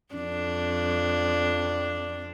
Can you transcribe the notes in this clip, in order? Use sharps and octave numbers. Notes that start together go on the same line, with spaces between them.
F2 D4